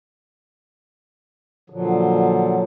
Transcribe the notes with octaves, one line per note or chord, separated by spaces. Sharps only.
A#2 D3 F3 F#3